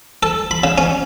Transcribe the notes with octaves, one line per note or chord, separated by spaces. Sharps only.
A4
B5
C#3
C#4